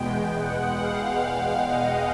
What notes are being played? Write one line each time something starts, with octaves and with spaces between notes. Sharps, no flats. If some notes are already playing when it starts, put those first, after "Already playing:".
Already playing: E2 B2 G#3 B3 G5
F#5
F5
F5
D#5